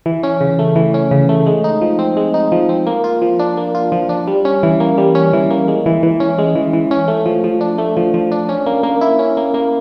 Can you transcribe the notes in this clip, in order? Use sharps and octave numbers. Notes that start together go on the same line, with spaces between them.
E3
C#4
C#3
A3
E3
C#4
C#3
A3
G#3
D#4
F3
C4
G#3
D#4
F3
C4
A#3
F4
F3
D4
A#3
F4
F3
D4
G3
C#4
E3
A#3
G3
C#4
E3
A#3
G#3
E3
E3
C#4
G#3
E3
E3
C#4
A3
F3
F3
D4
A3
F3
F3
D4
C#4
A#3
A#3
E4
C#4
A#3
A#3